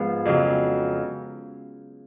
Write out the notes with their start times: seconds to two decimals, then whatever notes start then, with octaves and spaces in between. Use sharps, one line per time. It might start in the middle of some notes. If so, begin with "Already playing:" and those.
Already playing: G#2 F3 G#3 B3
0.25 F2 C#3 F#3